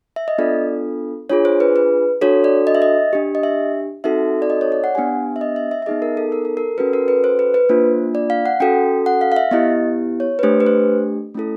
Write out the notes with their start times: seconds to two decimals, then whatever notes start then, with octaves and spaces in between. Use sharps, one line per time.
0.16 E5
0.28 D#5
0.38 B3 D4 F4 A4 D5
1.30 D4 F4 G#4 C#5
1.45 C5
1.60 B4
1.76 B4
2.21 D4 F#4 A4 C#5
2.44 D5
2.67 D#5
2.75 E5
2.82 D#5
3.13 D4 G4
3.35 D#5
3.43 E5
4.04 C4 D#4 F#4 A4 E5
4.42 D5
4.50 D#5
4.61 C#5
4.72 D5
4.84 F#5
4.95 B3 D4 G4 G#5
5.36 E5
5.41 D#5
5.56 E5
5.71 E5
5.82 E5
5.86 B3 D#4 G#4 D#5
6.02 A#4
6.17 A4
6.32 A#4
6.45 A4
6.57 A#4
6.78 C#4 F#4 A4 B4
6.93 A#4
7.08 B4
7.24 C5
7.39 B4
7.54 B4
7.69 A#3 D4 F4 C5
8.15 D5
8.30 F5
8.46 F#5
8.60 C#4 F#4 A4 G5
9.06 F#5
9.21 F5
9.32 F5
9.36 E5
9.51 B3 E4 G4 D#5
10.20 C#5
10.39 B4
10.43 A3 D4 G4 C5
10.60 B4
10.67 C5
11.34 A3 C#4 E4 A4